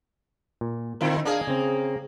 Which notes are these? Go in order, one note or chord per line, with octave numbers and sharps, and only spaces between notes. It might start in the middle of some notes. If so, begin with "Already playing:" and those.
A#2
D3 C4 E4 F4 A#4
A#3 D4 G#4 F5
C#3 C4